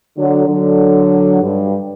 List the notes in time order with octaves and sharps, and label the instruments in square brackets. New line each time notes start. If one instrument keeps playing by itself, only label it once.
[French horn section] D3 F#3
D3 F#3
G2